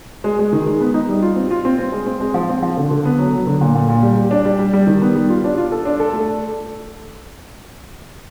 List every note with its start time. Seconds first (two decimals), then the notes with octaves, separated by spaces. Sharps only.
0.24 G#3
0.39 G#3
0.53 D#3
0.66 G#3
0.81 B3
0.94 D#4
1.09 G3
1.22 F4
1.36 C4
1.51 F4
1.65 C4
1.79 C4
1.92 G#3
2.06 C4
2.20 G#3
2.34 F3
2.49 C4
2.62 F3
2.77 D3
2.91 D3
3.05 B3
3.19 F#3
3.33 F#3
3.47 D3
3.61 A#2
3.75 A#2
3.89 A#2
4.03 G3
4.17 G3
4.31 D4
4.45 G3
4.59 G3
4.73 G3
4.87 D#3
5.02 B3
5.16 G3
5.30 F4
5.44 D4
5.57 F4
5.72 A4
5.85 D4
6.00 A4
6.13 A3